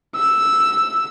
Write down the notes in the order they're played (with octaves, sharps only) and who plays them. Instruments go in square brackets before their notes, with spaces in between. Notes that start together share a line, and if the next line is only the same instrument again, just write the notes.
[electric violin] E6